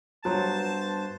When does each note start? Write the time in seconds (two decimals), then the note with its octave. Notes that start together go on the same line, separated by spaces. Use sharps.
0.25 G2 F#3 B3 C5 A5